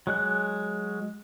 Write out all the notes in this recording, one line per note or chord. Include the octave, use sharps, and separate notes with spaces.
F#3 G#3 F#6